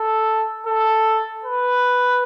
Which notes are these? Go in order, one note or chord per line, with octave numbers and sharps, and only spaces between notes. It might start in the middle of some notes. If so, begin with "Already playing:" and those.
Already playing: A4
A4
B4